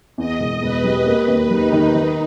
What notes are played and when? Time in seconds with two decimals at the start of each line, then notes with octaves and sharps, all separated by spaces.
0.18 E2 D#5
0.40 E1
0.62 E1 B4
0.84 G3
1.06 A#3 B4
1.28 D#2
1.50 G3 D#4
1.72 D#3
1.94 D#3 D#4